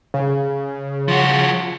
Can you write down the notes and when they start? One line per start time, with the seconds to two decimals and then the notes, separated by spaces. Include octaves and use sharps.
0.14 C#3
1.08 F3 F#4